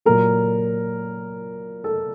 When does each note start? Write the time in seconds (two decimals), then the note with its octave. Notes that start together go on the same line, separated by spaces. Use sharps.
0.06 A#2 F#3 A#3 A#4
1.84 A4